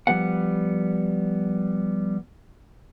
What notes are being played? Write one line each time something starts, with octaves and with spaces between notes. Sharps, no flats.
F3 G3 B3 F#5